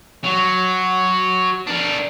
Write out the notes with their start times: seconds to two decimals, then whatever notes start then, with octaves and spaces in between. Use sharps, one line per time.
0.24 F#3
1.67 D4 A#4